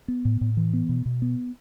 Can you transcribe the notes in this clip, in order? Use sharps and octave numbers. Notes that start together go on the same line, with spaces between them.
B3
A2
A2
E3
B3
B2
B2
B3